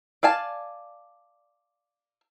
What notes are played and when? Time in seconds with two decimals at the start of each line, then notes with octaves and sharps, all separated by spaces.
0.23 D5 F5 G#5 A5